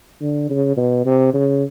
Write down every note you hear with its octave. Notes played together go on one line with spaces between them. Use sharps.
D3
C#3
B2
C3
C#3